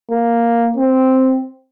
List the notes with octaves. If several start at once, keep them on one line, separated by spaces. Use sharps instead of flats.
A#3
C4